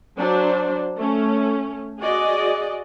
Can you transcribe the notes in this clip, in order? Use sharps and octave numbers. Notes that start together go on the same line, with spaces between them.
F#3 D4 C5
A3 C#4
F#4 G#4 D5 D#5